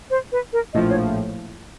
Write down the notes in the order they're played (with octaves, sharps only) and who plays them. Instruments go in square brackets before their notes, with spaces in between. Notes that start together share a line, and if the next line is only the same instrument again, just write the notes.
[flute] C5
B4
A#4
[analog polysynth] A#1 A2 F3 [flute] D#5
[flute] C#5